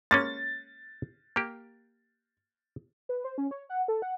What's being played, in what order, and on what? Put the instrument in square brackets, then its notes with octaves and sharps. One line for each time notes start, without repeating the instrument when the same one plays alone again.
[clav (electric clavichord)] G#3 A#3 C#4 [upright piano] A6
[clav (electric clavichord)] A#3 G4
[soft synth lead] B4
C5
C#4
C#5
F#5
A4
F#5